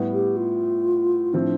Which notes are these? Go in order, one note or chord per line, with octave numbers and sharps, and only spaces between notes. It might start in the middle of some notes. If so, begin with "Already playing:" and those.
Already playing: A2 G3 B3
G4
F4
A2 F3 C4 D4